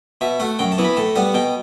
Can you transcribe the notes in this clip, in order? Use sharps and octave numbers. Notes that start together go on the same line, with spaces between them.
B2 E5
A3 F#5
F#2 G5
A5
E3 B3
B5
A2 A5
G3 B3 F#5
B2 G5